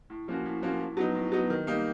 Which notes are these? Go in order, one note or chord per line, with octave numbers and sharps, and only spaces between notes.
A2
F3 A#3 C#4 F#4
A2
F3 A#3 C#4 F#4
A2
F#3 B3 D#4
A2
F#3 B3 D#4
D#3
G3 A#3 D#4 G4